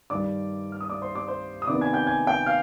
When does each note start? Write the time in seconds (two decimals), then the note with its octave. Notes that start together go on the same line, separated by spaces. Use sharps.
0.10 G2 D#3 G3 D5 D6
0.72 F6
0.81 D#6
0.89 D5 D6
1.02 C5 C6
1.15 D5 D6
1.28 C5 C6
1.62 D#6
1.67 C3 D#3 B3 D5 D6
1.81 G#5 G#6
1.93 G5 G6
2.07 G#5 G#6
2.27 G5 G6
2.46 F5 F6